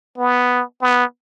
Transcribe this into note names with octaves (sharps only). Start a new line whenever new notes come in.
B3
B3